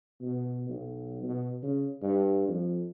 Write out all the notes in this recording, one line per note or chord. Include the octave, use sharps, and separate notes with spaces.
B2
B1
B2
C#3
G2
F2